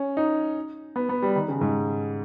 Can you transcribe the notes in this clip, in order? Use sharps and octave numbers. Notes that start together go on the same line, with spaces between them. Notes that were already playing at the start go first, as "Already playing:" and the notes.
Already playing: C#4
D#4
B3
B3
G3
D#3
C#3
G#2